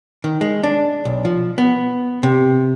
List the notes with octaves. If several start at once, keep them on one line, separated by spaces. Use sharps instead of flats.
D#3
G#3
D4
B1
F3
B3
C3